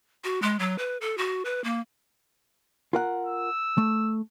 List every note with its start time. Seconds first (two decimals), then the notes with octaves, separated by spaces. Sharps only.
0.24 F#4
0.42 G#3
0.59 F#3
0.78 B4
1.01 A4
1.18 F#4
1.45 B4
1.64 A#3
2.93 F4 A#4 F#5
3.26 E6
3.78 A3